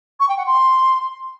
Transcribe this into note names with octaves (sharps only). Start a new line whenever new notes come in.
C#6
G5
F#5
C6